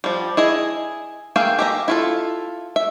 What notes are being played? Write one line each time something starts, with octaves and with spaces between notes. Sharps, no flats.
F3 G3
E4 G#4 D#5
A#3 G#4 E5 F5 G5
G4 E5 A#5
E4 F4 A4
E5